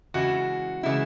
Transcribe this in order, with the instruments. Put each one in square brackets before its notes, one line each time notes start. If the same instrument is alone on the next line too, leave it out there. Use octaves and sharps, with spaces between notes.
[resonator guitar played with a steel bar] C#3 E3 G#3 E4 [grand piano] F#4
[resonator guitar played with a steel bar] C#3 E3 G#3 E4